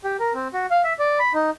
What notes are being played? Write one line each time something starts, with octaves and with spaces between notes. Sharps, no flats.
G4
A#4
C4
F#4
F5
E5
D5
B5
D#4